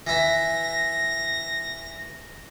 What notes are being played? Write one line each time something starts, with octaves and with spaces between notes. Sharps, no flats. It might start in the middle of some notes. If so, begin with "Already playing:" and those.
E3 E4 A#6